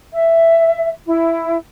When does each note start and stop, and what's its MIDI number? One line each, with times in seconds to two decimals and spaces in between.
0.12 0.89 76
1.06 1.56 64